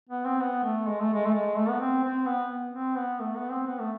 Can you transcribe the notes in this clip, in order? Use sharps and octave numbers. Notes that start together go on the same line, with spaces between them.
B3
C4
B3
A3
G#3
A3
G#3
A3
G#3
A3
B3
C4
C4
B3
C4
B3
A3
B3
C4
B3
A3